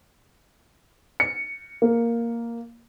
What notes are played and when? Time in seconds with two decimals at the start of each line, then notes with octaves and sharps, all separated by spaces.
1.20 C#7
1.82 A#3